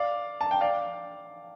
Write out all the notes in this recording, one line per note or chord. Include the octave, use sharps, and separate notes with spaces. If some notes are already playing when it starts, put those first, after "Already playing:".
Already playing: D5 F5
A5
G5
D5 F5